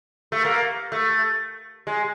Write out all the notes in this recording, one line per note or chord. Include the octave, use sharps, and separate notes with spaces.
A3
A#3
A3
G#3